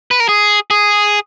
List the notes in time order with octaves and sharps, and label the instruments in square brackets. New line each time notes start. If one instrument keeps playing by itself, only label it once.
[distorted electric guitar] B4
A#4
G#4
G#4